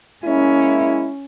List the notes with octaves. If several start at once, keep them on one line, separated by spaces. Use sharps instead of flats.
G#3 A#3 C#4 E4